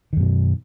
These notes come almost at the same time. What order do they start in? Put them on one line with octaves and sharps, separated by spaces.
D#3 F#2 B2